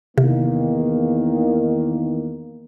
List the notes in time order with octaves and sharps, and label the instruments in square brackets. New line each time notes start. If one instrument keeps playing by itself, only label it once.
[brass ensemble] E2 D#3 A#3 [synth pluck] C3